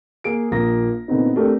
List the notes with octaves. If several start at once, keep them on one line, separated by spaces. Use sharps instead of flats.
A#3 G#4 D7
A#1 F3 A#3 A#5 D#6 A#6
A#2 D3 B3 C4 D#4
A3 C4 D4 G4 A4 A#4